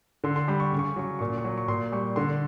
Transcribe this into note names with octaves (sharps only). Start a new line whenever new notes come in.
D3 C6
C6
G3 B5
C#6
C#3
C#6
F#3 C#6
A#2 C#6
C#6
F#3
C#6
A#2 C6
G3 C#6
D3 C6